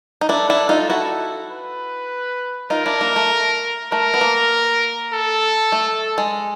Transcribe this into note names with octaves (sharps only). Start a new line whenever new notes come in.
D#4
D4 E4 A4
D4 E4
D#4 F4
E4 F#4
B4
D#4 F4 A#4
D4 E4
A#3
A3
A3 A#4
B3
A#3
A4
A3
G#3